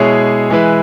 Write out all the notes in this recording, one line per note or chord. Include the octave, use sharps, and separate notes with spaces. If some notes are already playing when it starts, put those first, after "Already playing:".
Already playing: B2 G#3 E4 G#4 C#5
E3 G#3 E4 B4